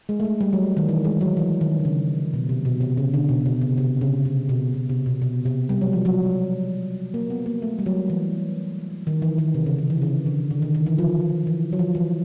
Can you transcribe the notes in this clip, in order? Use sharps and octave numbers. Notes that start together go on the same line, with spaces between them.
G#3
A3
G#3
G3
F#3
D#3
E3
G#3
F#3
E3
D#3
D3
C#3
B2
C3
B2
C3
C#3
D3
B2
B2
C3
C3
C#3
C3
B2
B2
C3
B2
B2
C3
G3
F#3
F3
F#3
A#3
B3
A#3
A3
G3
F#3
E3
D#3
E3
D#3
C3
C#3
D#3
E3
C3
C#3
D3
D3
D#3
D#3
E3
F3
E3
F#3
F3
E3